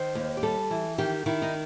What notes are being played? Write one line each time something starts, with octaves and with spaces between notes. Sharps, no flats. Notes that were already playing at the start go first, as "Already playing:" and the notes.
Already playing: D#3 C5
D#2
G4
G3 A4
E3
D#3 G4
D#3 E4
D#4